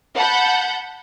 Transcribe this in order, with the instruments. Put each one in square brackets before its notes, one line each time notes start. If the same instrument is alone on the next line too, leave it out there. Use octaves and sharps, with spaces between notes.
[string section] F#5 A5 B5 G6